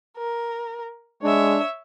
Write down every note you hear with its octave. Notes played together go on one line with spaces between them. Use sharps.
A#4
G#3 D4 C#5 E5